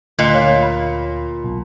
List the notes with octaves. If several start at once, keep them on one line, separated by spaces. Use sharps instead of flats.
D2 A#2 D#5 F#6 C#7
C#5 F5
B5
B1